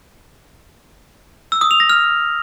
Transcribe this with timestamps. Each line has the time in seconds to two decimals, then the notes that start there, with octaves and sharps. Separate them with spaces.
1.52 E6
1.61 D#6
1.71 F7
1.80 A#6
1.90 F6